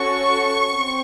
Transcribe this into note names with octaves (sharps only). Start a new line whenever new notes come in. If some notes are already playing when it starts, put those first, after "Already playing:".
Already playing: C#4 F#4 A4 C#6
C4